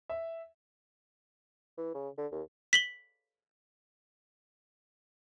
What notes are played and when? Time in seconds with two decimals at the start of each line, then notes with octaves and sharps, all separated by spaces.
0.10 E5
1.78 E3
1.94 C#3
2.18 D3
2.32 D#2
2.73 B6 F#7 G7